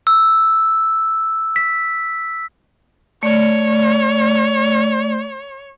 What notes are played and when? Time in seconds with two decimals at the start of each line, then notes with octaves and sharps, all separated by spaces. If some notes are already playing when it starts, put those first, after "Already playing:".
0.07 E6
1.56 B6
3.23 A3 C#5 D5